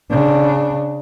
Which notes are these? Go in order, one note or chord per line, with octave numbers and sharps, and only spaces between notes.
C#3 D4